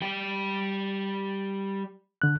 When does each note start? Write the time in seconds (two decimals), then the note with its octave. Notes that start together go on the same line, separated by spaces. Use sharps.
0.02 G3 G5
2.22 D3 F#6